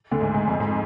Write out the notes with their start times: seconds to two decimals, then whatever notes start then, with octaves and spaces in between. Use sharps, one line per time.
0.11 D2 D3
0.20 G#2
0.34 G#2
0.48 F2
0.60 G#2